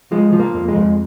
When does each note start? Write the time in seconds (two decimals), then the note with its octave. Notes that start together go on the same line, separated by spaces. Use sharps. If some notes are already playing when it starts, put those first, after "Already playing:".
0.12 F3 G#3
0.33 F3
0.39 A#3
0.54 F2
0.68 G#3
0.76 F2